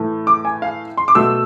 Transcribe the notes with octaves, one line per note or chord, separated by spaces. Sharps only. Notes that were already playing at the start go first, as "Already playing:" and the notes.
Already playing: A2 E3 A3
D6
G#5
F5
C6
D6
B2 A3 E6